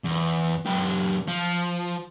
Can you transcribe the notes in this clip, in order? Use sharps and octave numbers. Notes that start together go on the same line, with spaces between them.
E2
F#2 G4
F3